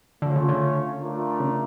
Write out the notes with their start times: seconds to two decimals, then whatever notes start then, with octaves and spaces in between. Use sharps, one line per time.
0.22 D3 A3 C#4 F4 C#5
0.36 C#3
0.49 D3
1.00 A3 D4 F4 A#4
1.40 C#3